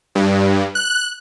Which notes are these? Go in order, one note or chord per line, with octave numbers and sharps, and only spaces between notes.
G2
F#6